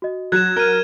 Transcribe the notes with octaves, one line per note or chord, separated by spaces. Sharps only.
F#4 D#5
F#3 F#6 G#6 E7
A#4 F6 G#6 D#7